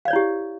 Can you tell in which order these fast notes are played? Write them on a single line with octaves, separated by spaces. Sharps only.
F5 D5 C#5 E4 G4